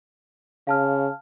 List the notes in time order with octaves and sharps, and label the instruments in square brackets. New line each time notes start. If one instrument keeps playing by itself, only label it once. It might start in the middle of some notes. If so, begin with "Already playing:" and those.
[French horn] C#3 [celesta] F5 A5 F6